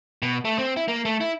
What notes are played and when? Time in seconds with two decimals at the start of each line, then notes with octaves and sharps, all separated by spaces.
0.22 B2
0.45 A3
0.58 C4
0.77 E4
0.88 A#3
1.05 A3
1.21 E4